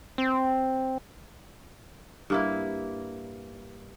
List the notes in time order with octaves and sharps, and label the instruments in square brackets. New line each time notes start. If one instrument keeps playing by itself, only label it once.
[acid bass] C4
[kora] G2 A#3 E4